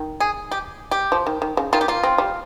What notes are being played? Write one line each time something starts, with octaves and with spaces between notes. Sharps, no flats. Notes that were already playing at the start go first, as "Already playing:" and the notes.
Already playing: D#3
G#4
G4
G4
F3
D#3
D#3
C#3
D#3 F4
G4
A#3 F4
C4
G3